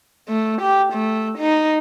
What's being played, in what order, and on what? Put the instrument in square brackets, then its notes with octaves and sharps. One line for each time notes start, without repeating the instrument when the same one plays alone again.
[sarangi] A3
G4
A3
D#4